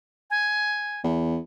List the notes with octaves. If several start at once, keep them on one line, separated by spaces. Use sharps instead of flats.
G#5
E2